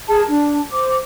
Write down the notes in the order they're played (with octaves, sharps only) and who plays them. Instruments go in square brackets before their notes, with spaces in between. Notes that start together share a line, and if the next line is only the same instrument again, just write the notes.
[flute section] G#4 A#4 A5
D4
C5 D6